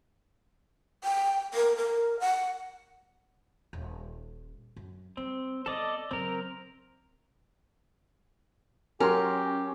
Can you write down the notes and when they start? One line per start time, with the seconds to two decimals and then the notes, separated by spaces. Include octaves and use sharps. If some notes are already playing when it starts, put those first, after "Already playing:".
1.04 G5
1.54 A#4
1.76 A#4
2.20 F#5
3.73 D#1
4.76 F#2
5.17 G3 C4
5.66 B3 A4 D5 D#5
6.11 C#3 F#3 C4 A#4
9.00 F#3 C#4 G4 A#4 C6